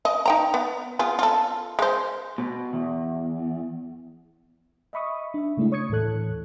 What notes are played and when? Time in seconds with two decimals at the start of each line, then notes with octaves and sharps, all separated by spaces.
0.05 D#5
0.26 D#4 G5 A#5
0.54 B3
0.99 B3 F4 G#4
1.19 F4 A4
1.79 G#3 C5
2.38 B2
2.73 E2
4.93 D#5 E5 B5 C#6 D#6
5.34 D4 E5
5.57 C#3 G#3 A3 D4 E4
5.72 C#5 C#6 D#6 G#6 C#7
5.89 D#2 A2 E3 A4 F#6